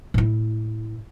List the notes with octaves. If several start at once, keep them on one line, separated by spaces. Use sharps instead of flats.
A2 E4